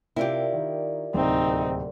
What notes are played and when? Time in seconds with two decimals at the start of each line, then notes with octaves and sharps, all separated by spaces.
0.16 C3 E4 F4 G4 A#4 D5
0.53 D#3
1.14 D1 D#2 C3 C4 D#4